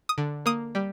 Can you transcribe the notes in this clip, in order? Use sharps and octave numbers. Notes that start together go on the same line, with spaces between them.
D#6
D3
A#3 D#6
G3